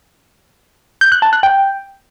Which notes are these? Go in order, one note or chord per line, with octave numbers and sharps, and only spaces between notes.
G6
F#6
A5
F#6
G5